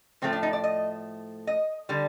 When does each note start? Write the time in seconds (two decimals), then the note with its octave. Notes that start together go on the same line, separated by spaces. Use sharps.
0.22 A2 F3 A3 C4
0.33 D4
0.43 D#4
0.53 D5
0.64 D#5
1.47 D#5
1.89 D3 G3